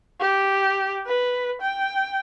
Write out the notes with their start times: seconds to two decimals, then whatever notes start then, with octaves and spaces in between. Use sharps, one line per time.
0.20 G4
1.06 B4
1.61 G5